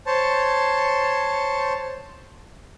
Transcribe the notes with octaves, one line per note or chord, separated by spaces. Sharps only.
C5 C#5 A5